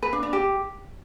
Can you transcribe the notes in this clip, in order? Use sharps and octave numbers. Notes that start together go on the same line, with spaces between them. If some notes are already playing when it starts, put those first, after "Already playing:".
B4
D4
D4
G4